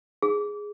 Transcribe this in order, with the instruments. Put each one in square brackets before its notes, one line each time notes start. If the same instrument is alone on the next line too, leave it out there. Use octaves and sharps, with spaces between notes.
[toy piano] G#4